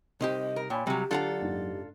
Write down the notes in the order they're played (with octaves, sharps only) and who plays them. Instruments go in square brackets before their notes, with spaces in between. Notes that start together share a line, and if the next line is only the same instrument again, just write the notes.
[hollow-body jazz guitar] C2 D#4 G4 [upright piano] C4 C5 [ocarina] D#5
[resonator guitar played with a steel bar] A#4
[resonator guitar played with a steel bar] A#2 [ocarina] C#5 [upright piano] G5 G#5 B5
[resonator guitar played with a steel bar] C3 F#3 [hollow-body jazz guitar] G3 [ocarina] G4
[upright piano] D3 [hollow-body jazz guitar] F#3 F#5 A#5 [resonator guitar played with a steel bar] D4 F4 A4
[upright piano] F#1 G#2